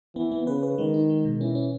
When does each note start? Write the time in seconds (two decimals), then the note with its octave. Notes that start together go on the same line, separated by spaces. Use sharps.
0.16 E3 B3
0.31 B3
0.47 C#3 B4
0.63 B4
0.78 D#3 G#3
0.94 D#4
1.10 G#3
1.25 B2
1.40 E3 C#4
1.55 C#4